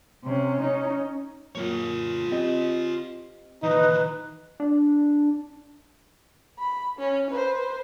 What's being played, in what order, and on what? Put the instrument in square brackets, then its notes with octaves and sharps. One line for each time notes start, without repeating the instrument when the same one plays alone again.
[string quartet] C3 C#4
C#4 D#4
[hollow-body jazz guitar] F#2 A#2 A#3 [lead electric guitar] F4 C#5
[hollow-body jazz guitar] C4 G4 D#5
[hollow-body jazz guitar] A#2 [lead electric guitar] D#3 E3 [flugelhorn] D#4 [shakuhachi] B4
[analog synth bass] D4
[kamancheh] B5
C#4
B4 C5